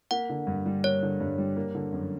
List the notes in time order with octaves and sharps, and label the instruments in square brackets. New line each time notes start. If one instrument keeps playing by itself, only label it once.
[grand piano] A#3 [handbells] F#5
[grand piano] D3
G2
G3
[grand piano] A#3 [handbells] C#5
[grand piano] D3
G2
G3
A#3
D3
F#2